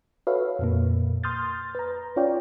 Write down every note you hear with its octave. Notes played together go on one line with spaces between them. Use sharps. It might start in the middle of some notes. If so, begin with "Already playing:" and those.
F#4 A4 B4 C#5 E5 F5
F2 A#2 A#3
C6 D#6 F6 G6 A6
B4 A#5
C#4 F4 C#5 D5 F5 G5